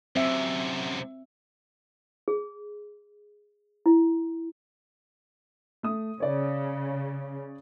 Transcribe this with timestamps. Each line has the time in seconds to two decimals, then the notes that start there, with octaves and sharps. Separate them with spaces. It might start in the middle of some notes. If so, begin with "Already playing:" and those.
0.16 F#2 C3 C4 E5
2.28 G#4
3.86 E4
5.83 A3 D#6
6.20 C#3 C#5 D5